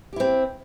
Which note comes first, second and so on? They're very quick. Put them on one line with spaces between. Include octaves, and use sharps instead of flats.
G4 E4 C4